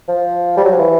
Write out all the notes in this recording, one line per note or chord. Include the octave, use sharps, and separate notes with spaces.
F3
G3
F#3
F3
E3